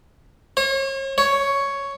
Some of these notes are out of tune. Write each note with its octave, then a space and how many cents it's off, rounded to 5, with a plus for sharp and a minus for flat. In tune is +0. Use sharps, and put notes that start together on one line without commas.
C#5 -40
C#5 +5